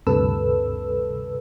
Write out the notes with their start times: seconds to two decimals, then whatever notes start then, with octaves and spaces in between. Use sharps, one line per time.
0.07 D2 G2 C3 A4 B4 E6